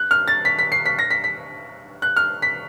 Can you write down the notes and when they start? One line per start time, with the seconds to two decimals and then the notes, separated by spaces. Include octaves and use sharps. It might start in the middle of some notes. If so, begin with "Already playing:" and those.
Already playing: F#6
0.11 F6
0.28 A6
0.45 B6
0.59 B6
0.72 C7
0.86 B6
0.99 A#6
1.11 B6
1.24 B6
2.02 F#6
2.17 F6
2.42 B6